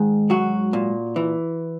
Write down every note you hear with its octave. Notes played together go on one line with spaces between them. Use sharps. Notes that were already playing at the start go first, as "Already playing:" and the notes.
Already playing: G#2 D#3
F#3 F#4
A#2
E3